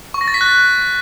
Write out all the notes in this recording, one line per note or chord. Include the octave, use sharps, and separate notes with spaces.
C#6
A#6
A6
B6
F#6